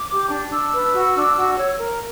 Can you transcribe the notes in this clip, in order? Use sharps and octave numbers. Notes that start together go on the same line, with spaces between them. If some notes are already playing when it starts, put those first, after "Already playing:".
Already playing: D6
G4
D4
D4 E6
B4
F#4
D4
F#4
C#5
A#4